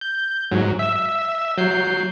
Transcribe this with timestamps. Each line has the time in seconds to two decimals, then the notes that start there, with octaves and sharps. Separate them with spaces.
0.01 G6
0.51 G#2 F#3
0.79 E5 E6
1.58 F#3 G6 C7